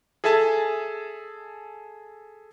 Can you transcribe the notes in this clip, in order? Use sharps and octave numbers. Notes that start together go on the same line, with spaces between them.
G#4 A4 E5 G#5 A5